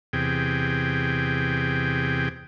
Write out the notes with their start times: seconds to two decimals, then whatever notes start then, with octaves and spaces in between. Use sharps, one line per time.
0.13 E2 C3 G#4 G5